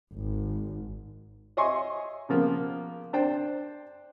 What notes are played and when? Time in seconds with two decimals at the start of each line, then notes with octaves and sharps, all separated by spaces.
0.14 G#1
1.57 C#5 D#5 E5 G#5 C6 C#6
2.29 C#3 F3 A#3 B3
3.13 D4 C5 G5